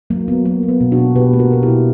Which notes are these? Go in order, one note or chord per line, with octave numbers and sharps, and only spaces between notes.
F#3 A#3
F#3 B3
F#3 A#3
F#3
B3
B2
D4 F#4
B2
B2 G4 B4
A#3
F#4 A#4
B2 A#4
E4 G4
B2